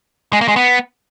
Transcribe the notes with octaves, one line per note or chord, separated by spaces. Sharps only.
G#3
A#3
G#3
B3